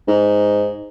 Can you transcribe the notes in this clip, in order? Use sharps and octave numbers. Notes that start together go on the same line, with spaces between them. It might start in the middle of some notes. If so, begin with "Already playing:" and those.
G#2